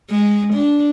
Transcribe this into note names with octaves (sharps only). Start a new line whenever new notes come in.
G#3
D4